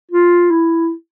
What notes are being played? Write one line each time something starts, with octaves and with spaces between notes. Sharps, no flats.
F4
E4